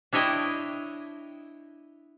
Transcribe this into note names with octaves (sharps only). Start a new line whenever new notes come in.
D4 E4 C#5 D#5 G5